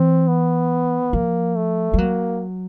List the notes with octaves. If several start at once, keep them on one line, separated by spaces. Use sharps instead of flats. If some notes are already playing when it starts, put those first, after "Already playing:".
Already playing: E3 C4
B3
F3 A#3
A3
G3
F#3 A#3